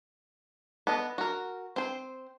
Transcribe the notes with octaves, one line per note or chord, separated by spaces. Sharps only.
B3 A4 D#5
F#4 A#4
C4 C5